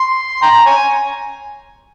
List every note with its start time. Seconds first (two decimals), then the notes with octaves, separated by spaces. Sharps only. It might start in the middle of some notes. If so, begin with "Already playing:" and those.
Already playing: C6
0.42 G5 A#5
0.66 C#5 G#5